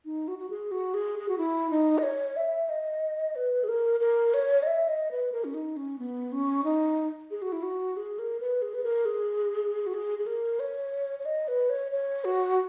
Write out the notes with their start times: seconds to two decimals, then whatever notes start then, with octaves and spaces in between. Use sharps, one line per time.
0.05 D#4
0.28 F#4
0.39 F#4
0.50 G#4
0.71 F#4
0.94 G#4
1.19 G#4
1.29 F#4
1.38 E4
1.70 D#4
1.98 D#5
2.03 C#5
2.36 E5
2.69 D#5
3.36 B4
3.64 G#4
3.68 A#4
4.00 A#4
4.34 C#5
4.62 D#5
4.67 E5
4.88 D#5
5.11 B4
5.32 A#4
5.44 C#4
5.54 D#4
5.77 C#4
5.99 B3
6.32 C#4
6.64 D#4
7.31 G#4
7.42 F#4
7.52 E4
7.63 F#4
7.97 G#4
8.19 A#4
8.40 B4
8.62 G#4
8.74 B4
8.84 A#4
9.05 G#4
9.86 F#4
9.94 G#4
10.19 G#4
10.26 A#4
10.60 C#5
11.19 C#5
11.25 D#5
11.48 B4
11.70 C#5
11.92 C#5
12.25 F#4